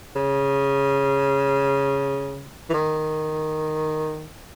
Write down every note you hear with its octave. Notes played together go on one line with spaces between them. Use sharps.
C#3
E3
D#3